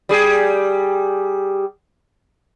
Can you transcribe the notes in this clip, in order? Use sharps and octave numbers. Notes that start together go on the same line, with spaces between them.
G3 G#4